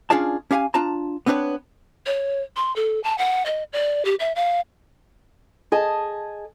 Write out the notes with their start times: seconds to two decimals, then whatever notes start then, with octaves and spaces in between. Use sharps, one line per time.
0.10 C#4 D4 F4 G#4 D5 A5
0.51 C#4 G4 F5 F#5 G#5
0.74 D4 F4 A5 A#5
1.26 B3 C4 D4 B4 C#5
2.06 C#5
2.56 C6
2.76 A4
3.03 A5
3.18 F#5
3.45 D#5
3.73 D5
4.05 G4
4.19 E5
4.36 F5
5.72 G#4 D#5 G#5 A5